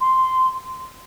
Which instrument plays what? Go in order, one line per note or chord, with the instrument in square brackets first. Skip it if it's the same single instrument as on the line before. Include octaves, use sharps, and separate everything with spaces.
[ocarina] C6